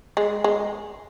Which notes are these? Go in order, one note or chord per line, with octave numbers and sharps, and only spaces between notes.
G#3
G#3